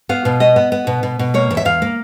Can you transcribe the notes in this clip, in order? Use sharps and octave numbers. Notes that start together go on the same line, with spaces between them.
B3 F5
B2
B3 D#5
B3
B3
B2
B2
B2
A#3 C#5
E2
E5
E2 F5
A#3